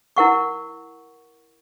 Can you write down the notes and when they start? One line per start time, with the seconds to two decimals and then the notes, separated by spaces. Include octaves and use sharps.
0.17 E4 A#4 F#5 C#6